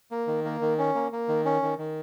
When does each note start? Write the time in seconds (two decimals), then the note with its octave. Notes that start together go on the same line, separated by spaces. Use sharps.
0.11 A#3
0.27 D#3
0.45 A#3
0.62 D#3
0.78 C#4
0.95 A#3
1.12 A#3
1.28 D#3
1.45 C#4
1.63 D#3
1.78 D#3